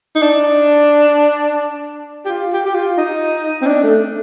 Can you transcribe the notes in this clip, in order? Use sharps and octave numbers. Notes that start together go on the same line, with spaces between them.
D#4
D4
G4
F4
G4
G4
F4
D#4
C4
D4
A3